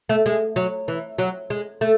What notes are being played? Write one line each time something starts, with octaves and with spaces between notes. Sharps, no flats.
A3
G#3
F#3
E3
F#3
G#3
A3